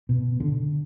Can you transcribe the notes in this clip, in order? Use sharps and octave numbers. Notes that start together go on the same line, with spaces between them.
B2
D3